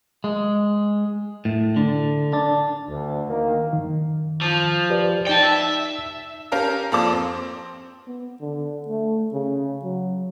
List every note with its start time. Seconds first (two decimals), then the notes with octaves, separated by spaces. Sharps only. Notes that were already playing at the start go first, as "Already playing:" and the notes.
0.24 G#3
1.45 A2
1.76 D3
2.33 D4
2.89 D2
3.29 D#3 A#3
3.73 F#2 D#3
4.41 F3
4.90 G4 B4 D5
5.27 D#4 D5 G5 A5
5.43 E5
6.52 C#4 G4 A#4 F5 A5
6.92 F2 A#3 A4 D5 D6 E7
7.13 C4
8.07 B3
8.41 D3
8.88 A3
9.33 C#3
9.84 F#3